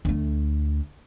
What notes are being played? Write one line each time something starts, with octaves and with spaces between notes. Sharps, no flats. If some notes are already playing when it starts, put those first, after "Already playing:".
D2 A3